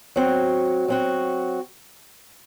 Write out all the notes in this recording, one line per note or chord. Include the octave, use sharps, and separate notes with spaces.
F#3 C4 F#4
F#3 C4 F#4